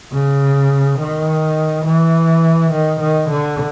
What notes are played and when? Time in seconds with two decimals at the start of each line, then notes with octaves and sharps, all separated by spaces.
0.12 C#3
0.99 D#3
1.85 E3
2.71 D#3
3.00 D#3
3.29 D3